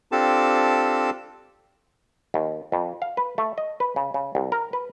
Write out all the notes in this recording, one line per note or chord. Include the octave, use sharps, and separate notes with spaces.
C4 D4 F4 G4 A4 A5
D#2
F2
F5
B4
A3
D#5
B4
C#3
C#3
C2
A#4
B4